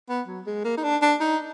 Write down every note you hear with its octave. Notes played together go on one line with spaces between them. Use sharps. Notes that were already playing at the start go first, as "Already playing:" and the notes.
B3
F#3
G#3
A#3
D#4
D4
D4
D#4